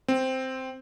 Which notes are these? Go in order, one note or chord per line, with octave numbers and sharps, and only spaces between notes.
C4